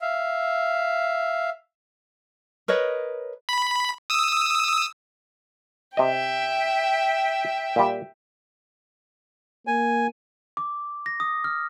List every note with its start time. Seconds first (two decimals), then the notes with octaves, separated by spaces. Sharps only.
0.01 E5 F5
2.68 A#4 B4 C#5 D#5
3.49 B5
4.10 D#6 E6
5.97 C3 D#5 E5 G5
7.76 A#2 G3
9.67 A#3 G#5
10.57 D6
11.06 A#6
11.20 D#6
11.44 F6